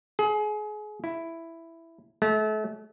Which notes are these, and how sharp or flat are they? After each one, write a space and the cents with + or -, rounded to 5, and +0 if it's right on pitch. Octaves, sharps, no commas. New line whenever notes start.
G#4 +30
E4 +5
A3 -35